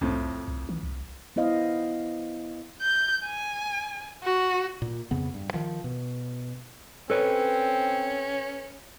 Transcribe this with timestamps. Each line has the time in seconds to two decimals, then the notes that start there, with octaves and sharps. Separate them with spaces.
0.01 C2 F2 A2 C4
0.48 C2
0.69 E3
0.83 C2
1.36 B3 E4 C5 D#5 F5
2.81 G6
3.24 G#5
4.23 F#4
4.82 A#2
5.11 F2 C#3 B3
5.34 G2
5.54 D#3 F3
5.84 B2
7.10 C4 C#4 A4 B4 C#5